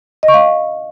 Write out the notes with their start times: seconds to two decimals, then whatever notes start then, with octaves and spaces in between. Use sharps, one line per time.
0.23 D#5
0.28 C#6
0.34 F5